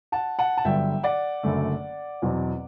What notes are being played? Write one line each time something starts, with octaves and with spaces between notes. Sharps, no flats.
F#5 A5
F#5 A5
A5
G1 G2 D3 F#3 E5 G5
D5 F#5
F#1 F#2 D3 A3
E2 B2 F#3 C4